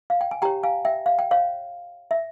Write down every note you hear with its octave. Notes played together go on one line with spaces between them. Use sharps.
F5
G5
G#5
G4 C#5 G5 A#5
F5 G#5
E5 G5
F5
G5
C#5 F5
E5